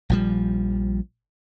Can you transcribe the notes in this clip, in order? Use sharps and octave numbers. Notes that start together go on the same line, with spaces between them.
A#1 F3 G3